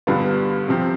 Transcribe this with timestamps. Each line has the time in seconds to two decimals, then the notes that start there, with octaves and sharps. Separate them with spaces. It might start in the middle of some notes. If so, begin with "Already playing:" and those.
0.07 G2 D3 G3 B3 F4
0.68 C3 F3 C4